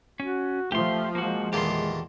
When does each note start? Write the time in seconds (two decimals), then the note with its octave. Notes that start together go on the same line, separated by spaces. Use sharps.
0.20 C#4 F#4
0.72 F3 A3 G4 C6
1.15 G#3 A#3 F#4
1.53 E2 A#2 D#3 G4 A4 C6